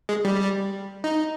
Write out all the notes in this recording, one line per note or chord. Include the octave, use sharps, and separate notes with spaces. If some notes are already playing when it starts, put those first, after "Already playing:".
G#3
G3
D#4